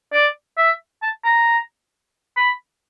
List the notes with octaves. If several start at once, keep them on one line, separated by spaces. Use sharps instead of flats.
D5
E5
A5
A#5
B5